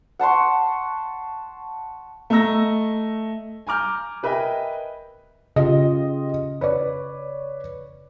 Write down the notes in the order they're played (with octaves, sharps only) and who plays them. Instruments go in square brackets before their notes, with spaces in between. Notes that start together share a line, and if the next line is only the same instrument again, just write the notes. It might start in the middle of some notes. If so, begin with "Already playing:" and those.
[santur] F#5 A5 C6 C#6
[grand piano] A3 D#5 A#5 E6 A#6
G#5 A#5 D6 F6 G6
A#4 B4 D#5 E5 G5 G#5
[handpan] C#3 [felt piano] F4 G4 D#5
[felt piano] B4 C#5 D5